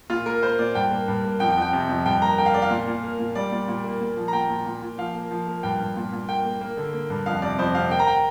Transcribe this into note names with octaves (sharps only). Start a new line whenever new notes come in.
A#2 F4
A#3 A#4
A#3 C5
A#2 D5
G2 G5
A#3
G2
A#3
F2 G5
G5
F2
G5
C3
F2
G2 G5
A#3 A#5
A#3 G5
F5
A#3 D5
F5
A#2
A#2
A#3
A#2
G3 D5
A#2
A#2
A#3
A#2
F3
A#5
A#2 G5
A#2
A#2
A#2
F3 F5
A#3
F3
A#3
G2 G5
G2
A#2
A#2
A#3 G5
A#3
A#3
D3
A#3
G2
F2 F5
C3 D5
F2 C5
C3 F5
A#3 G5
A#5
G5